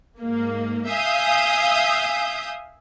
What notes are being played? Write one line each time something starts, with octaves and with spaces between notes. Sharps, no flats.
G#2 A#3
E5 F5 G#5 D#6 G6